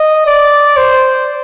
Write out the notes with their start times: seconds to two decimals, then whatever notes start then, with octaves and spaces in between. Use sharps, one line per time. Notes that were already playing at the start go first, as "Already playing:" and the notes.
Already playing: D#5
0.27 D5
0.77 C5